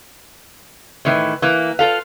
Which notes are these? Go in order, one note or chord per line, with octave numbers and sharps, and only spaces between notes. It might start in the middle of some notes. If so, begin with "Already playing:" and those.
A2 D#3 E3 E4
E3 A#3
F4 A4 F5